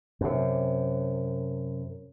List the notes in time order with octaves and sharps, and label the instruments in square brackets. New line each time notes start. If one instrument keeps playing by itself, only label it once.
[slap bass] F#2 C3